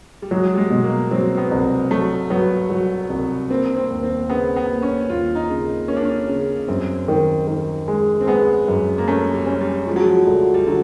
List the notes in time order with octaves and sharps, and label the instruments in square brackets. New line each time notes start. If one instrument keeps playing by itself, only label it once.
[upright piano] G3
[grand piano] F#3 [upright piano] G#3
[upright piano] G3
G#3
[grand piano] B2
[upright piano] A#3
[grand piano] F#3 [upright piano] C4
[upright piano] B3
[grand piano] C2
[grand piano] F#3 [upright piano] A3
[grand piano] F#3 [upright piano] B3
[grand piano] F#3
C2
[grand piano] A#3 [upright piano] C4
[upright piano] C4
[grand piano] D#2
[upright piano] C4
[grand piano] C#3 [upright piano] B3
[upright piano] B3
[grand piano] A#3
[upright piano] C#4
[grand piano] D#2 [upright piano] F4
[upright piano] D#4
[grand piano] C#3
[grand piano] A#3 [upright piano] C#4
[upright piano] D4
C#4
[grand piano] C#3
[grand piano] F#2 [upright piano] C4
[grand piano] D#3
D#3
G#3
[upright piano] C4
[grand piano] G#3 [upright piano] B3
[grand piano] F#2
[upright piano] A#3
[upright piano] A3 [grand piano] C#4
[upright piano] G3
[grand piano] C#4
[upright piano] G3
[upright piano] F3 [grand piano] G#3
[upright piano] F#3
F3
[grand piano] D2
[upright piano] G3
[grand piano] D3 [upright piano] F#3